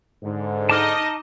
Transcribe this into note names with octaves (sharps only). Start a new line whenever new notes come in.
G#2 D3
D#4 D#5 A5 D6 F6